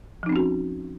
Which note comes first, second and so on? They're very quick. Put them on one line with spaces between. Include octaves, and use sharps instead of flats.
F3 D#4 C4 C#4 F#4